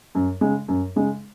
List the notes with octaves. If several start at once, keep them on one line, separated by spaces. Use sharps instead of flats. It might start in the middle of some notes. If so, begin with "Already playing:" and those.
F#2
C#3 G#3
F#2
C#3 G#3